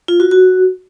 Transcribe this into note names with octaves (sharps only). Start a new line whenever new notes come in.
F4
F#4
F#4